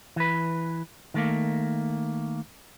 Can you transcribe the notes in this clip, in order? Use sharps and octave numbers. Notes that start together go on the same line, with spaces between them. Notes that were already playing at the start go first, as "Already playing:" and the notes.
E3 B4
D#3 A3 A#3